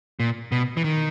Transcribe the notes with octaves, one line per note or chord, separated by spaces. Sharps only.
A#2
B2
E3
D#3